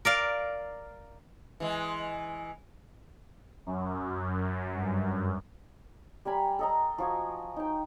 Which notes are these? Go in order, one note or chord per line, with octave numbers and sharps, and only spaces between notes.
A#4 D5 F5
E3 G#3
F#2
G2
G3 A#4 G#5 B5
A4 D#5 A#5
F3 F#4 G#5
D#4 G5